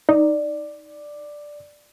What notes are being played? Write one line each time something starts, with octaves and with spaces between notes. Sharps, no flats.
D#4 D5